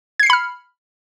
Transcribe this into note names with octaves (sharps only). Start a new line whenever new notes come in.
B5 F6 G#6 C7 C#7